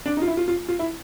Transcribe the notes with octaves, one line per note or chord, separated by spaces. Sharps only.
D4
D#4
F4
E4
F4
F4
F4
E4